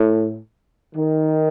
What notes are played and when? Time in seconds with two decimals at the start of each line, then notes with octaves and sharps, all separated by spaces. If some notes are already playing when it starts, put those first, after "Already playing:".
Already playing: A2
0.96 D#3